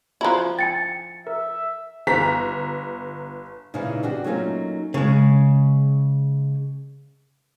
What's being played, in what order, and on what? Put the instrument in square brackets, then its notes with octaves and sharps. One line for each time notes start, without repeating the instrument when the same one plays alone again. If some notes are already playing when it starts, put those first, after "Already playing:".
[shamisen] F3 E4 [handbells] F#4 A#5 F#6
[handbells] G5 G#5 [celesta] A6 C#7
[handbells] A#4 [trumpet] E5
[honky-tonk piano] G1 A#5 B6
[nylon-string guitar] A#2 C#3 E3 D#4 E4
A#2 D4 F#4 G4
F#3 A3 A#3 C#4 D#4 F4
[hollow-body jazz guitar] C#3 G#3